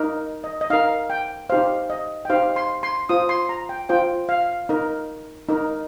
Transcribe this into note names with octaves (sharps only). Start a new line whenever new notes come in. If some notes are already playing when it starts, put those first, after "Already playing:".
Already playing: D#4 A#4
D#5
D#5
D#4 A#4 F5
G5
D#4 G4 C5 F5
D#5
G5
D#4 G4 C5 F5
C6
C6
F4 C5 D#6
C6
A#5
G5
F4 C5 G5
F5
D#4 A#4
D#4 A#4